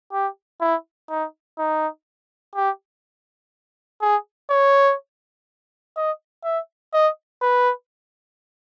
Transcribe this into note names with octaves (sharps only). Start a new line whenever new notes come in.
G4
E4
D#4
D#4
G4
G#4
C#5
D#5
E5
D#5
B4